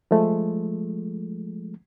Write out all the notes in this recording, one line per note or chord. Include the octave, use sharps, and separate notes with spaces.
F3 G#3 A3